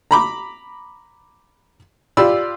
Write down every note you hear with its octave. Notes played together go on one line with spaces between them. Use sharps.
A#5 B5 D6
F4 G4 D5 B5 E6